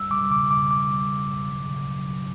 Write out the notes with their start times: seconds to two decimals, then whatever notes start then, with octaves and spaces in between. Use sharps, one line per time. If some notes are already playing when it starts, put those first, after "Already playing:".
Already playing: G3 E6
0.11 G3 D6
0.31 C#3 D6
0.51 C#3 D6
0.70 C#3 D6
0.90 G3
1.10 C#3
1.30 C#3
1.49 F#3
1.70 C#3
1.88 F#3
2.09 F#3